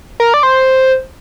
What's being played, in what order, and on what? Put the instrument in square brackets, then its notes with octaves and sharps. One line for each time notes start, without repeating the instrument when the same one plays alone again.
[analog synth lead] A#4
D5
C5